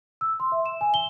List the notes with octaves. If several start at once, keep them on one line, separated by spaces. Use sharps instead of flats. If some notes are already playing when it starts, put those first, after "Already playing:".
E6
C6
E5
E7
G#5
G7